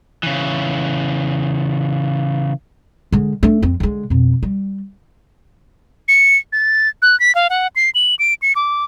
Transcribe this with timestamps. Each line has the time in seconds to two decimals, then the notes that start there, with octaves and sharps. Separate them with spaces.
0.23 C#3 E3
3.12 D3 G#3
3.43 A3 D4
3.62 F2 C4
3.80 D3 G#3
4.10 F2 B2
4.43 G3
6.08 C#7
6.53 A6
7.02 F#6
7.20 B6
7.35 F5
7.50 F#5
7.76 C7
7.95 F#7
8.19 D7
8.42 C#7
8.56 D6